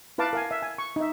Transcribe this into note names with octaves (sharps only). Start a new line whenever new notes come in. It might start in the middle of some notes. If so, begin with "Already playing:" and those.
E4 B4 F5 A5 D6
A#4 F5 G#5
E5
G#5
C#6
D#4 E5